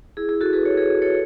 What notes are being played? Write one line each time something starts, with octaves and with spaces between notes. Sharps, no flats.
E4 G#4
E4 G#4
F#4 A4
G#4 B4
A4 C#5
G#4 B4
A4 C#5